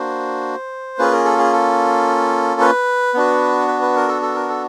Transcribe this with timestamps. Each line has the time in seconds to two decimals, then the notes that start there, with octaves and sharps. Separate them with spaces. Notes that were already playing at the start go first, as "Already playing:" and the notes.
Already playing: A#3 D4 F#4 C5
0.98 A#3 C#4 F4 G#4 B4
1.12 A#4
1.25 A4
1.38 G#4
1.53 A4
2.61 B4
3.14 B3 D4 F#4
3.68 B4
3.82 B4
3.96 A#4
4.08 A4
4.22 A4
4.35 A#4
4.49 A4